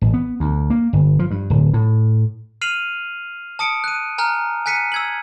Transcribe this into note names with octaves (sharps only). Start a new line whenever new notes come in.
A1
B3
D2
A#3
G1
F3
G2
D1
A2
F6 C7 D#7 F7 F#7
A5 D#6 C#7 D7
F#6 D#7
G#5 A#5 F6 F#6
G#5 F#6 B6 C#7 D#7
E6 G#6 F#7